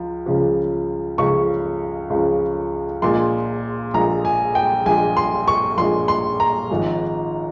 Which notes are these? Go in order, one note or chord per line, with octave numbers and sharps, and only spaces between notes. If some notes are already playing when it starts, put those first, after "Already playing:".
Already playing: C#2 F3
C#2 C#3 F3
C#2 C#3 F3 C#6
C#2 C#3 F3
A#1 A#2 G#3 C6
A#1 A#2 G#3 A#5
G#5
G5
A#1 A#2 G#3 G#5
C6
C#6
A#1 A#2 G#3 C6
C6
A#5
G#1 G#2 F3 G#3